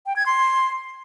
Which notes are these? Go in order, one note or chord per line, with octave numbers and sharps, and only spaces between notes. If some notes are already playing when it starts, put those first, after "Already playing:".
G5
G#6
C6